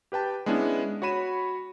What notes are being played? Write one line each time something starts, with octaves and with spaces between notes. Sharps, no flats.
G4 B4 G5 A5
G#3 B3 C#4 D4 E4
F#4 C#5 B5 D#7 E7